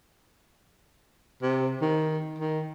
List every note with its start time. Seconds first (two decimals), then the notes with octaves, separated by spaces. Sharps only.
1.42 C3
1.81 D#3
2.38 D#3